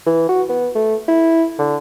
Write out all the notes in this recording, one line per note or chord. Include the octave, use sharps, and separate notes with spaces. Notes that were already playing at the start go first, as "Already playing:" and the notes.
E3
F#4
B3
A3
E4
D3